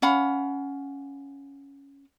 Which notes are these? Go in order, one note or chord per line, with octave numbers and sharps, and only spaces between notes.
C#4 F5 F#5 B5